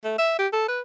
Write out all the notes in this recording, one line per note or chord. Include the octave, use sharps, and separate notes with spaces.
A3
E5
G4
A4
B4